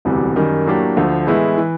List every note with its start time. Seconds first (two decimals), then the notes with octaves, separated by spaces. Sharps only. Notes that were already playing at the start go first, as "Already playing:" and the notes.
0.05 E1 D2 C3 E3 G3
0.36 F#2 D#3 G3
0.66 A2 F#3 A#3 D4 G4
0.97 D2 D3 F3
1.27 A2 E3 G#3 B3 E4
1.57 E3